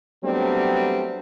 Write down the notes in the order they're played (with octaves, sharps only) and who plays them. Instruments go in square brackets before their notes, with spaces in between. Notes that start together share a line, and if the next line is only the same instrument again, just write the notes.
[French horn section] F#3 G3 A3 B3 C4 D4